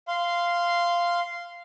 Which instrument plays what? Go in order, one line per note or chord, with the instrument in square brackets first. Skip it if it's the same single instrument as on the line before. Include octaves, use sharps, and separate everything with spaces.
[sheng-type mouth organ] F5 C6